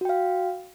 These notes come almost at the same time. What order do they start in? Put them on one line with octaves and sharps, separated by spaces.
F#4 G5 F5